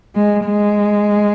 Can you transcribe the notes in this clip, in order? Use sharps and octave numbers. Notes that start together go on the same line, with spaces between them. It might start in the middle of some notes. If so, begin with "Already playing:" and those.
G#3
G#3